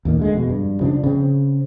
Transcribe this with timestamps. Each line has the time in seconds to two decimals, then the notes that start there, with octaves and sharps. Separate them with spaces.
0.05 D#2 A#2 D#3
0.19 D3 G#3
0.34 F2 B2
0.50 G2
0.81 C#3 F3 C4 D4
1.04 C#3 C4